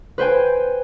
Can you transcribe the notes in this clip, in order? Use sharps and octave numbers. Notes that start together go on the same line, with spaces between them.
B4 C5 G5 G#5